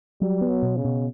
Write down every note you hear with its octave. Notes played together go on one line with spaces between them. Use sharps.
F#3 G3
B3
F#3
B2
C#3
B2